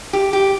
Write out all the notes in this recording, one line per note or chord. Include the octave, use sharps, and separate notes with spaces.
G4
G4